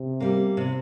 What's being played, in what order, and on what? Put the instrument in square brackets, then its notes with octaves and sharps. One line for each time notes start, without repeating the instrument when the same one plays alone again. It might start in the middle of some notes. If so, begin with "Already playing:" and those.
Already playing: [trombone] C3
[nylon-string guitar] G3 A#3
C3